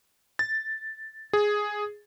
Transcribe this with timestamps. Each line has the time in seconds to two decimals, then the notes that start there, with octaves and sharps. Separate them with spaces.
0.39 A6
1.33 G#4